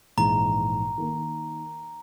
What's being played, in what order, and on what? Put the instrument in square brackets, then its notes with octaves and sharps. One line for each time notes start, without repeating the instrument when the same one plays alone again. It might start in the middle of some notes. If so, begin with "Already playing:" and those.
[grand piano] A#1 G#2 E3 [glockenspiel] A#5
[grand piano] D#3 A#3 D#4